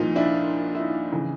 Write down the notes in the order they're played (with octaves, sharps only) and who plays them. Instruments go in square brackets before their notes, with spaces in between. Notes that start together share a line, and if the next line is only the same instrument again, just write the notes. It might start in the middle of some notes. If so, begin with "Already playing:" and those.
Already playing: [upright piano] C2 A#2 F3 D#4 F4
D4 E4
E4
D#4
C#3 E3